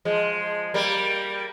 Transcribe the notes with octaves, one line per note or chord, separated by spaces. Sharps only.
F3 G#3
G3 A#3